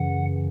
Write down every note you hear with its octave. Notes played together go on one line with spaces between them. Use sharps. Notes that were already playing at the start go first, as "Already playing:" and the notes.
Already playing: F#2 C#3 E3 F#5